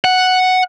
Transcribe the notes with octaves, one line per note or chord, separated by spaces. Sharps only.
F#5